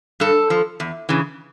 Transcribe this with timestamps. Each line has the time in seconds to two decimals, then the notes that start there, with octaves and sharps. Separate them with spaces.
0.20 G2 A4
0.50 F3
0.80 E2
1.09 C#3 E3